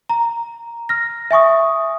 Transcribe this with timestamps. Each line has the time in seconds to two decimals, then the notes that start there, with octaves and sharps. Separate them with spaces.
0.09 A#5
0.89 F6 A#6
1.31 E5 G#5 C#6 D#6